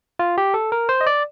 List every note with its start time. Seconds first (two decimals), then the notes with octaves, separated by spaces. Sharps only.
0.19 F4
0.38 G4
0.54 A4
0.72 A#4
0.89 C5
1.01 D#5
1.07 D5